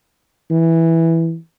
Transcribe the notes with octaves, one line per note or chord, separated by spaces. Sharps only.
E3